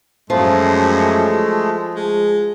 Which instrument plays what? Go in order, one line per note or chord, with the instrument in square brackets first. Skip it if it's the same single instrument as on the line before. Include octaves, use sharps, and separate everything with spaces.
[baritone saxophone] F#2 [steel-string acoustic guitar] F3 [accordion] G#3 A3
[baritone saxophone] G#3